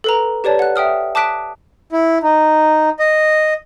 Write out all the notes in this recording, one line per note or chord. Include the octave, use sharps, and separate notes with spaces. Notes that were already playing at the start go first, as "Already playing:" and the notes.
A4 B4 A#5
G4 B4 C#5 D5 A5
F#5 F#6
E5 G5 D#6 F6
A5 D6 D#6 F#6 B6 D7
E4
D#4
D#5